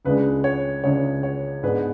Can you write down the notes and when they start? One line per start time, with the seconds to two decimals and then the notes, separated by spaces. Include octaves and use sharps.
0.05 C#2 C#3 G#3 D4 B4
0.44 C#5
0.84 C#2 C#3 G#3 D4 C#5
1.23 C#5
1.63 G#2 G#3 B3 D4 B4